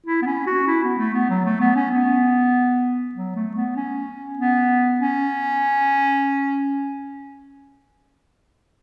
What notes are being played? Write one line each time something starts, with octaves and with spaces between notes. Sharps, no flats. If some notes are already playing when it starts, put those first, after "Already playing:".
E4
B3
C#4
F#4
E4
B3
A3
B3
F#3
A3
B3
C#4
B3
F#3
A3
B3
C#4
B3
C#4